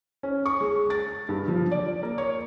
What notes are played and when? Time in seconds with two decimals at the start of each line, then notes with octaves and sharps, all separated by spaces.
0.23 C#4
0.46 C#6
0.61 G#3
0.90 A6
1.29 G2
1.48 F3
1.71 D5
2.03 A#3
2.18 C#5